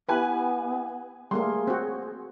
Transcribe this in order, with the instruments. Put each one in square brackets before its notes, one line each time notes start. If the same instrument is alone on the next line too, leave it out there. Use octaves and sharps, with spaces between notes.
[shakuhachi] B3 [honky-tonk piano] E4 G4 G#5 [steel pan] B4
[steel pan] G3 A3 A#3 [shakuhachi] G#4 [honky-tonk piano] C6
[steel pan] C4 F#4